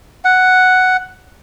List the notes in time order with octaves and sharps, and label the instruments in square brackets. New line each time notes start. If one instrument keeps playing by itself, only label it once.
[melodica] F#5